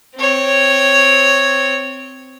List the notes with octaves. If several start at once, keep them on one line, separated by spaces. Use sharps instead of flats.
C4 C#5